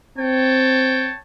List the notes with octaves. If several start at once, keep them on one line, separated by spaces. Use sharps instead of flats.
C4 C#5 G5 A5